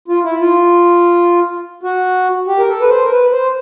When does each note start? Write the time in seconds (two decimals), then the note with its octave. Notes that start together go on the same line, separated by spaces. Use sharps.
0.08 F4
0.24 E4
0.39 F4
1.83 F#4
2.47 G4
2.59 A#4
2.68 A4
2.81 B4
2.89 C5
3.03 A#4
3.11 B4
3.32 C5